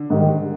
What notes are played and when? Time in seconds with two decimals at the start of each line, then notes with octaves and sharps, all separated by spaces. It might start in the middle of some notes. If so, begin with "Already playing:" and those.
Already playing: D3
0.10 G#2 D#3 G3